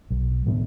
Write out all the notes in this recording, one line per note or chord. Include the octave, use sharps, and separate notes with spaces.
B1
A2 E3 B3